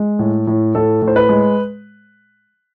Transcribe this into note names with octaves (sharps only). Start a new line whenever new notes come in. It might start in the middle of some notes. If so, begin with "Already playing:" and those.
Already playing: G#3
A2
A2
A2 A4
A2
C5
B4
G#3